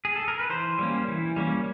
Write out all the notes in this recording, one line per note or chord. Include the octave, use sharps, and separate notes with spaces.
G#4
A4
A#4
B4
E3 C5
G3 A#3 C#4
E3
G3 A#3 C#4